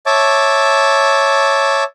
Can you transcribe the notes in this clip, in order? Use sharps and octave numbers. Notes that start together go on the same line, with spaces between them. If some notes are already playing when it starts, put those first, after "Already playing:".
C#5 E5 A5 D6